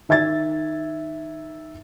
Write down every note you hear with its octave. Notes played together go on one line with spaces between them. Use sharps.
D#3 E5 G#6 A6